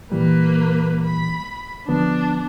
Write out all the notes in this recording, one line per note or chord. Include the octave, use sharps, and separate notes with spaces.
A#2 E3 G3 A#3 B4
B5
D3 F3 B3 D4